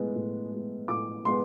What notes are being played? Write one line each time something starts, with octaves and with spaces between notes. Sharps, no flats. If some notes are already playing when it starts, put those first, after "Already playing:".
Already playing: A2 G#3 B3
A2
G#3 B3
A2 D6
G#3 B3 C6